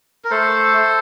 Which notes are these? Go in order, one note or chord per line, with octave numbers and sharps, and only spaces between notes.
A#4
A3 A4 C5